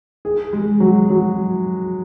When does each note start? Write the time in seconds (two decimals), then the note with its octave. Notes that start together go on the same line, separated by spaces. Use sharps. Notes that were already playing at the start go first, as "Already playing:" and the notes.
0.25 G#4
0.53 G#3
0.80 F#3
1.10 F#3